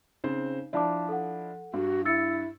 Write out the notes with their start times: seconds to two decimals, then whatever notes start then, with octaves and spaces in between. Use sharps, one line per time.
0.24 C#3 C4 D#4 C5
0.73 F3 D4 E4 D5 A5 D6
1.09 A4 F#5
1.73 G2 F#4
2.05 E4 E6 A6 C#7